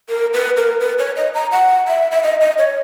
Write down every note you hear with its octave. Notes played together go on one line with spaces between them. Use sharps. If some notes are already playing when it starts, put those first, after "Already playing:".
A#4
B4
A#4
B4
C#5
D#5
A#5
F#5
E5
E5
D#5
D#5
C#5